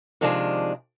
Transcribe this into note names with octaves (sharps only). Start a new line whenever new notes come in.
C3 D#3 F3 G#3 D4 G#4